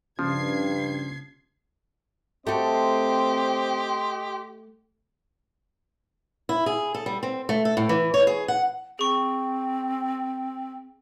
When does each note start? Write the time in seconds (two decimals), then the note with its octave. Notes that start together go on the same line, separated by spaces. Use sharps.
0.19 G2 C#3 F3 G#6 C7
2.47 A3 C4 F#4 G4 D#5 C6
6.49 E4
6.66 G#4
6.94 A4
7.06 G3
7.23 C4
7.49 A3
7.65 A4
7.77 A2
7.89 E3
8.14 C#5
8.27 G#4
8.48 F#5
8.99 C4 G#4 C#6